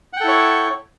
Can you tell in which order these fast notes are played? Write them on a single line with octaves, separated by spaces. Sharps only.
F#5 G5 A4 E4 C#5